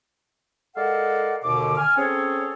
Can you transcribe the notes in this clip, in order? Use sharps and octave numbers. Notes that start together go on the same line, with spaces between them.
G#3 A4 A#4 D5 F5 F#5
D#2 B2 D3 D6
G#5 F6
C4 C#4 G#4 A4 C#5